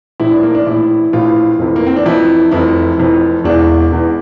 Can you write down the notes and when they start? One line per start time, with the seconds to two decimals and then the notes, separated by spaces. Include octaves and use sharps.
0.20 A#1 A2 E3 E4
0.31 D4
0.43 A#3
0.55 D4
0.66 A#1 A2 E3 E4
1.13 A#1 A2 E3 F4
1.59 F1 F2 E3
1.76 A#3
1.87 C4
1.96 D4
2.06 F1 F2 E3 E4
2.51 F1 F2 E3 E4
2.98 F1 F2 E3
3.44 E1 E2 E3 D4
3.91 E1 E2 E3